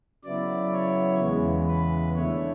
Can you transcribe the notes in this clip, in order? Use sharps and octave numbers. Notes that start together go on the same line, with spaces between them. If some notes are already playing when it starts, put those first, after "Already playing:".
C#3 F#3 B3 E4 D5
C#5
E2 C#3 E3 G#3 B3
B4
D3 A3 E4 C#5